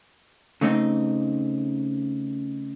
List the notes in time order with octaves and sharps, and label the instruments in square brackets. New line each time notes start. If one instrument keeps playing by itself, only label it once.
[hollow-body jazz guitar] C#3 A3 C4 D#4